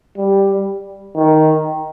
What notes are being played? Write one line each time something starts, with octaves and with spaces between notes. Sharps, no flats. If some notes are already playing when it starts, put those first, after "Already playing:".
G3
D#3